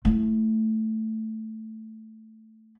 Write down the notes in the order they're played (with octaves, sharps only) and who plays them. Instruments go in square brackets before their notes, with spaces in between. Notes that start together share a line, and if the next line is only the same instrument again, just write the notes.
[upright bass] A3 E4